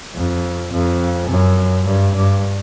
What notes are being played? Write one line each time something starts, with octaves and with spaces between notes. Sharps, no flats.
F2
F2
F#2
G2
G2